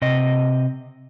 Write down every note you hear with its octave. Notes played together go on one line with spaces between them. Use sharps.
C3 D#5